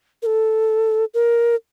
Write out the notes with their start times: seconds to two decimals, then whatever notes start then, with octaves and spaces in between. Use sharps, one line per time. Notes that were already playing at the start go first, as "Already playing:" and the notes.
0.22 A#4
0.26 A4
1.14 A#4